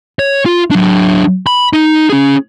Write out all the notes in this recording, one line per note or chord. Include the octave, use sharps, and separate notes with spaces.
C#5
F4
F#3 D4
B5
D#4
C#4 G#4